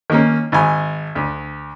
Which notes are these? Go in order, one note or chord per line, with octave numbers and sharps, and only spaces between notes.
D#3 A#3 C#4
G#1 G#5
D2